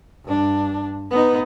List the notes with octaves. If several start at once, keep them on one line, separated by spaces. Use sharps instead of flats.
G2 D4
B3 D#4